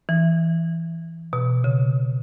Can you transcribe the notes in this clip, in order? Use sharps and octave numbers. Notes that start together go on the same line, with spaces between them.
E3
B2
C#3